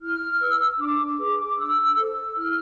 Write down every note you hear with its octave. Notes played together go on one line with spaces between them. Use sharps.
E4 F6
B4 E6
D4 D6
G#4 B4 D6
D6
D4 E6
A4 C5 E6
E4 F6